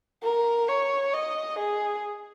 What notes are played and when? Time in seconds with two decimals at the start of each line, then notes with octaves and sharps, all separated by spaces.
0.23 A#4
0.69 C#5
1.13 D#5
1.59 G#4